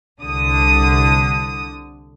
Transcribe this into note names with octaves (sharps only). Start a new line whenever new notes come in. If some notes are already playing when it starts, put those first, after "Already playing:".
C2 D3 D#6